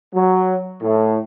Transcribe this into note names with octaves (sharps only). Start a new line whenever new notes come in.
F#3
A2